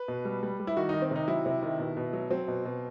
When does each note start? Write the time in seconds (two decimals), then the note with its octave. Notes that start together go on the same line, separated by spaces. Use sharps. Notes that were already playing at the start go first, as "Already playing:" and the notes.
Already playing: B4
0.08 B2
0.25 G3
0.43 G3
0.60 G3
0.67 E4
0.77 D#3 F#4
0.89 D#3 D#4
1.02 C4
1.11 C3 D#4
1.28 F#3 E4
1.46 C3
1.63 D#3
1.79 B2
1.97 B2
2.13 F#3
2.30 F#3 C4
2.48 B2
2.65 B2